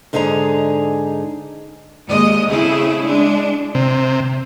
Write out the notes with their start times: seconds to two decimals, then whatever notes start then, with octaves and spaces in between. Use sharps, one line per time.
0.13 G#2 D3 D#4 G#4 D#5 A#5
2.07 D#2 G#3 D#5
2.49 C#3 A3 C4 E4 G#4
3.04 G#3 D4
3.75 C3